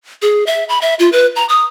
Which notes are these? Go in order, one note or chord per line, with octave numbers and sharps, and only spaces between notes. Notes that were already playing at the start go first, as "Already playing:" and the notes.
G#4
E5
B5
E5
F4
B4
A#5
D#6